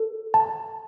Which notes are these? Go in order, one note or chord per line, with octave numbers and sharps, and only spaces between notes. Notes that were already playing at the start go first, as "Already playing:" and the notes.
Already playing: A4
A5